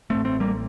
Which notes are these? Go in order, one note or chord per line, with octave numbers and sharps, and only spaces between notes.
A1 A2 A3 C4
A3 C4
G3 A#3